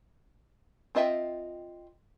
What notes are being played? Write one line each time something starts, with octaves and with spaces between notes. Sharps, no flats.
C4 F4 D#5 E5 G5